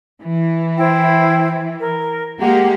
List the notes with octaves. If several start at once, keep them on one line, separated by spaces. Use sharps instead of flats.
E3
E4 C5 G5
A#4
G#3 A#3 G4 F#5